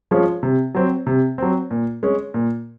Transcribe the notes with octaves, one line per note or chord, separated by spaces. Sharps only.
F3 G#3 C#4 F4
C3
F#3 C4
C3
F#3 C4
A#2
G#3 C#4
A#2